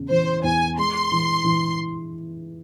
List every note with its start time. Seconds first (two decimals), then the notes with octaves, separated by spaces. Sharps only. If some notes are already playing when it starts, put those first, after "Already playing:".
Already playing: E2 C#3
0.10 E3 C5
0.43 E2 G#5
0.78 G#3 C6
1.12 E3
1.44 E3